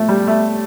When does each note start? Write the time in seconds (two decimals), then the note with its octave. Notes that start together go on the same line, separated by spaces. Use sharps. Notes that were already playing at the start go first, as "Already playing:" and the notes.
Already playing: A2 F3 A3
0.09 G3
0.27 A3